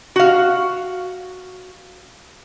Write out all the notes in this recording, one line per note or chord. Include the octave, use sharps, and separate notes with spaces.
F#4 F5